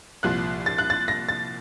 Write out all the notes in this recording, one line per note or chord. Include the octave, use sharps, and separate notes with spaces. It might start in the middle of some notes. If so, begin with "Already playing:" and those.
C2 A#2 F3 F#6
A6
F#6
A6
A#6
A6